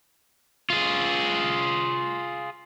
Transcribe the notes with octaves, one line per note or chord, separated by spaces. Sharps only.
F4 G#4